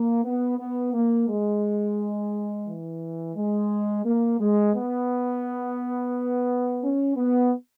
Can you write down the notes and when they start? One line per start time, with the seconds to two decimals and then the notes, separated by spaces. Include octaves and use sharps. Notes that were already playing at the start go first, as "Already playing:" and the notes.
Already playing: A#3
0.25 B3
0.59 B3
0.94 A#3
1.28 G#3
2.66 E3
3.36 G#3
4.05 A#3
4.40 G#3
4.74 B3
6.83 C#4
7.17 B3